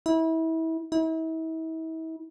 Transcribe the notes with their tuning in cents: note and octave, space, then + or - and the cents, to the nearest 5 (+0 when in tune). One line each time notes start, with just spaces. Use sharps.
E4 -30
E4 -40